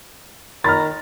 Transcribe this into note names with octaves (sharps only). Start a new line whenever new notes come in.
D#3 A#5 B5 F6 A6